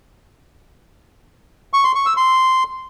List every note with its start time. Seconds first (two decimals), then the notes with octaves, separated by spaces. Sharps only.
1.73 C#6
1.84 C6
1.95 C#6
2.06 E6
2.17 C6